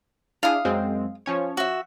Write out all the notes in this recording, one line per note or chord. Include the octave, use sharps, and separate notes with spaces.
D4 E4 G#4 F5 D#6
F#2 G#3 C4
F3 C#4 C#5
F#4 E5